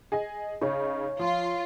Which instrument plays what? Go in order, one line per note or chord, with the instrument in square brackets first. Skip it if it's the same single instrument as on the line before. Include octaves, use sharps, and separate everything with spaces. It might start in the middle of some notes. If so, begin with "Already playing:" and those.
[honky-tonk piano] G#4 D#5 G#5
[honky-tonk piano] C#3 D#4 [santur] C#5
[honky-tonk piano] F3 [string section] F4